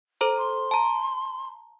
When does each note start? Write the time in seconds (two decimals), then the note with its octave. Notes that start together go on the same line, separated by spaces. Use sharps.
0.21 A4 C5 A#5
0.38 C6
0.71 A5 A#5